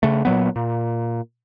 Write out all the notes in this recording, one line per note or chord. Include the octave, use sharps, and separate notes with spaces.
C#3 A3
A#2 F#3 B3
A#2